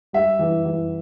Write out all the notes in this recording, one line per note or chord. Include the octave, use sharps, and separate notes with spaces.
G3 E5
E3
E3